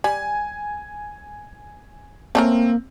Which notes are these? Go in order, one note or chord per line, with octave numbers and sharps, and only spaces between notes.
G3 G#5
A3 A#3 C4 C#4 A#4